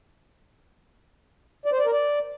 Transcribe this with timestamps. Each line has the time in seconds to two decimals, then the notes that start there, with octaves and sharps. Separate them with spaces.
1.66 D5
1.72 C5
1.79 D5
1.86 A#4
1.92 D5